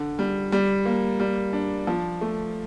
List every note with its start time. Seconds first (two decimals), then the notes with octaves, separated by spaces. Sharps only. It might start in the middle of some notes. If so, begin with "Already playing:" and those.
Already playing: D3
0.19 G3
0.52 G3
0.85 A#3
1.20 G3
1.53 D4
1.87 F3
2.21 A3